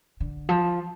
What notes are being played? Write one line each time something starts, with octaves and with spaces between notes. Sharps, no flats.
D3
F3